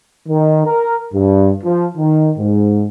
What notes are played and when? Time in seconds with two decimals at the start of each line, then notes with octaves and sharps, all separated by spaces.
0.28 D#3
0.66 A#4
1.14 G2
1.64 F3
1.97 D#3
2.38 G#2